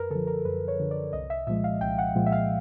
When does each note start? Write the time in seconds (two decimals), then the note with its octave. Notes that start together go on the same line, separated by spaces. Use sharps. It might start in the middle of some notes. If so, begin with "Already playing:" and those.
Already playing: F#2 A#4 B4
0.10 D3 F3 A4
0.27 A#4
0.45 F#2 B4
0.68 C#5
0.80 D3 F3
0.91 D5
1.13 C2 D#5
1.30 E5
1.47 A#2 F3 G#3 E5
1.64 F5
1.81 C2 G5
1.98 F#5
2.15 A#2 F3 G#3
2.26 E5
2.32 F5